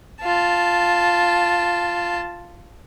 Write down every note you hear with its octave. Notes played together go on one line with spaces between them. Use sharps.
F4 A5